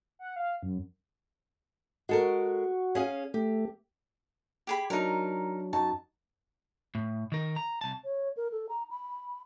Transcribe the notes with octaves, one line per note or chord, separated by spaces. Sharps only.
F#5
F5
F#2
G#3 F#4 A4 A#4
C#4 G#4 F5
A3 G4
G4 G#4 B5
F#3 D4 D#4 A#4
F#2 D#4 F#4 A5
A2
D#3 A#4
A#5
C2 A5
C#5
A#4
A4
A#5
B5